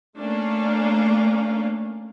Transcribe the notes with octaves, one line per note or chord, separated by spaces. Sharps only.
A3 A#3 C#4 D4 F5